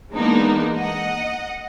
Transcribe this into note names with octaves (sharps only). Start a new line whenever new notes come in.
E3 G#3 A#3 B3 D4 D#4
D#5 F#5